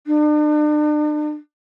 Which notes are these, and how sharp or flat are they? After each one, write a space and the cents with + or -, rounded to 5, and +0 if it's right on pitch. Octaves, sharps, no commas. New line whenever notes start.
D4 +40